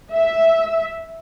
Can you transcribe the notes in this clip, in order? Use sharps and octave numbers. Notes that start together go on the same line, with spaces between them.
E5